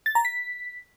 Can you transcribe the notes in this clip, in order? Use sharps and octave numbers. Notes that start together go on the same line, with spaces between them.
A6
A#5
B6